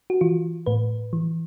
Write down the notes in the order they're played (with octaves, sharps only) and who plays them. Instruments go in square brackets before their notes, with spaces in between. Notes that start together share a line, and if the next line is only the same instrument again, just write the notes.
[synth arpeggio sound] F#4
E3 F4
A2 B4
E3